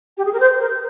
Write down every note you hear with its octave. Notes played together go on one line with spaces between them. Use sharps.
G4
G#4
A#4
C5
A#4